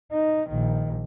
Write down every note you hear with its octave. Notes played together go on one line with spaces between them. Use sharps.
D#4
A#1 D#3